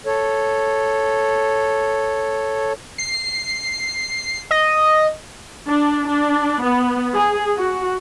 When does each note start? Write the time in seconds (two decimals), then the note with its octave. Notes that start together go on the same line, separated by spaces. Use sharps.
0.06 A4 C#5
2.98 C7
4.51 D#5
5.67 D4
6.06 D4
6.62 B3
7.13 G#4
7.57 F#4